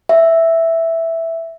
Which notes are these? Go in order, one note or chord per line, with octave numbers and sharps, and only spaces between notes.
E5